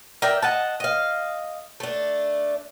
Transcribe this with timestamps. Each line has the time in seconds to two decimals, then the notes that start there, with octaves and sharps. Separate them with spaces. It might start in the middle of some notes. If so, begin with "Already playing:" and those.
0.22 A#4 D5 E5 G5
0.42 D#5 F#5 A5
0.80 D#5 F5
1.80 A3 D4